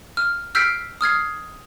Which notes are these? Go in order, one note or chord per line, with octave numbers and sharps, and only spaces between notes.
F6
E6 F6 G6 B6 C7 D7
D#6 F6 G#6 C7